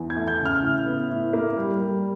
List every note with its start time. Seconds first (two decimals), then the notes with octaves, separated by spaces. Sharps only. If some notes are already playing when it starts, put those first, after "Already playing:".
Already playing: E2
0.10 G#6
0.16 A3
0.28 G6
0.40 C#3
0.45 F6
0.62 A2
0.86 B3
1.10 A2
1.33 A#3
1.57 G3
1.80 G3